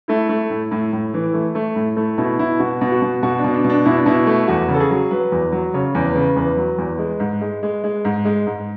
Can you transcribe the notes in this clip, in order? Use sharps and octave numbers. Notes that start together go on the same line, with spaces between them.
A3 E4
A3
A2
A2
A2
E3
A3
A3
A2
A3 E4
B2 E4
B2 E4
B2 F#4
B2
F#4
B2
B2 F#4
D4
B2
D4
B2
D4
B2 E4
D4
B2 E4
A3
E2 F#4
C#3
A4
G#4
F#3
F#3 B4
E2
F#3
C#3 C#5
E2
B4
C#3
E2 B4
F#3
E2
G#3
G#2
G#3
G#3
G#3
G#2
G#3
G#2